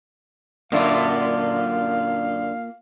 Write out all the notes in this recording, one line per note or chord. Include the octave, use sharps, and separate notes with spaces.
F#2 D3 A#3 F4 D5 E5 F5